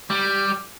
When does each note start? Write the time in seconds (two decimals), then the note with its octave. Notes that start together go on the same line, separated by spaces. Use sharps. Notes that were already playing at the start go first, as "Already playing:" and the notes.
0.10 G3